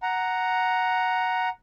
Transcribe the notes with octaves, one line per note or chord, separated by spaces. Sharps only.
F#5 A#5